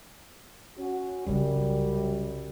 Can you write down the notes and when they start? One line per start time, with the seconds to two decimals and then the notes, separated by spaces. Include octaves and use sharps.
0.78 C#4 F#4
1.27 C2 F#2 C#3 G3